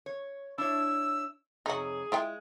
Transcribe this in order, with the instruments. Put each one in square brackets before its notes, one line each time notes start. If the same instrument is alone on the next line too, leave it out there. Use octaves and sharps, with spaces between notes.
[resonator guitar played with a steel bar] C#5
[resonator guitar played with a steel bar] D4 E4 C#5 [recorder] E6
[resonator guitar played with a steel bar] F2 C3 C#5 [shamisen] D#4 F#4 [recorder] G#4
[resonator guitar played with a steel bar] G#3 [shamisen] E4 F4 G5